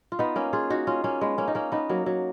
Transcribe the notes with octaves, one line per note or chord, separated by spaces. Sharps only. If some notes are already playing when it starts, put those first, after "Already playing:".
F4
B3 D#4
A#3 C#4
F4 G#4
D#4 F#4
C#4 F4
A#3 C#4
G#3 B3
A#3 C#4
D#4
A#3 C#4
B3 D#4
F#3 A#3
F#3